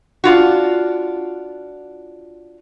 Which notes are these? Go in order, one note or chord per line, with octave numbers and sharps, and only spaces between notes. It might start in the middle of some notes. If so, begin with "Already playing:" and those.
D4 F4 F#4